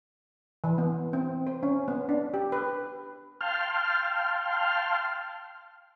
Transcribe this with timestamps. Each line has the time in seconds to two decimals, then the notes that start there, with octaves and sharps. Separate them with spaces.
0.64 E3
0.78 B3
1.13 C4
1.47 C5
1.63 C#4
1.88 B3
2.09 D4
2.34 G4
2.52 B4
3.41 F5 G5 A5 C6 F6